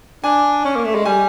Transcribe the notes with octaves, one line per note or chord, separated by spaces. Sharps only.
D4 G#5
C#4
A#3
A3
G#3
G3 G#5